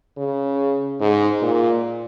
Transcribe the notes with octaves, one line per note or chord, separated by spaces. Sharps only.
C#3
G#2
A#2